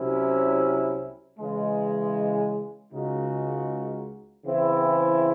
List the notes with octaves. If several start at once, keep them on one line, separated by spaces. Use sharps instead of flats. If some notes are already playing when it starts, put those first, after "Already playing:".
Already playing: C2 C3 F#3 C#4 E4
C#3 E3 G#3
C#2 C#3 G#3 D#4 F#4
C#3 E3 C4 E4